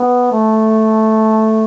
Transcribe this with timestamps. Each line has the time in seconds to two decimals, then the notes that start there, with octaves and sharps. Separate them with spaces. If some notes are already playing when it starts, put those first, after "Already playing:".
Already playing: B3
0.32 A3